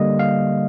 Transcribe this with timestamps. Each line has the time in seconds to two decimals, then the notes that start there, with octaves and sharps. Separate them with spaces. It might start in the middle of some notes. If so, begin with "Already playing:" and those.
Already playing: D3 G3 A#3 D#5
0.19 F5